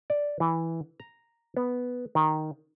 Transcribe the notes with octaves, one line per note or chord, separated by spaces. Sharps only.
D5
E3
A#5
B3
D#3